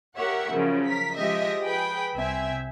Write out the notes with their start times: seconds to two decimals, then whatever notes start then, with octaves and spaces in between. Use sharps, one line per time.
0.17 G4 A#4 C#5 E5 F#5
0.50 F#2 C#3 F3
0.86 A#4 B6
1.16 F3 G#3 G4 D#5 E5
1.63 G#4 B4 G5 B5
2.16 C2 C4 E5 G#5